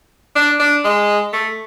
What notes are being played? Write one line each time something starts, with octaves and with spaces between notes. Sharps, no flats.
D4
D4
G#3
A3